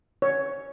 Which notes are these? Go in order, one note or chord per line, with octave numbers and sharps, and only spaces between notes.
C#5